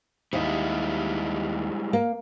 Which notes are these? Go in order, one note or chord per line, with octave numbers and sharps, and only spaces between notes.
D#2 G3 G#3 E4
A#3